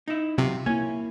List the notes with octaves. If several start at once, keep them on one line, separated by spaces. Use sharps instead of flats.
D#4 E4
C3 F#3 F4
A#3 E4 C#5 G#5